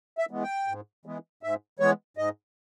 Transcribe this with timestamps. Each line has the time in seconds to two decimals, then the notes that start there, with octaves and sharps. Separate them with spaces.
0.18 E5
0.31 E3 G#3 B3
0.43 G5
0.68 G#2
1.05 E3 G#3 B3
1.43 G#2 E5
1.79 E3 G#3 B3 C#5
2.17 G#2 D#5